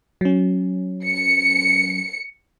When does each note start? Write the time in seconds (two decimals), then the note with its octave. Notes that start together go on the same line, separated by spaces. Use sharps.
0.21 F#3 C#4
1.07 C#7